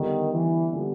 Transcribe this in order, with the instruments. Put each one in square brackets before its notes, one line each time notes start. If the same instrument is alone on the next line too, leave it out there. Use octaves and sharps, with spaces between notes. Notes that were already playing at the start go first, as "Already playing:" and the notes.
Already playing: [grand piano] D3 G3 B3 [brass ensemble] D#3
[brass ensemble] E3
[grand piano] D3 G3 B3